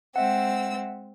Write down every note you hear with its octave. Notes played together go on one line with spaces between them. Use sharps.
G#3 C4 E5 F#5 E6